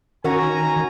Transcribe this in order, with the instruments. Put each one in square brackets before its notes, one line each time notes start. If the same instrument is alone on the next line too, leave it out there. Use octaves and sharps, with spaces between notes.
[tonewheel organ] D#3 [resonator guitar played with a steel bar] C#4 F#4 [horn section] G#5 A#5